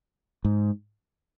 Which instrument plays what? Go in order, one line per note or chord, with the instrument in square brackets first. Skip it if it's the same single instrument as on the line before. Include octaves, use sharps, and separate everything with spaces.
[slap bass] G#2